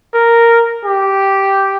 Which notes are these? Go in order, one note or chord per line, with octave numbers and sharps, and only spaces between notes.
A#4
G4